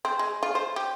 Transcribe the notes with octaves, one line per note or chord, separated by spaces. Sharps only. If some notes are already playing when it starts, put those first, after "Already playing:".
C4
G#3
F4
C5
G4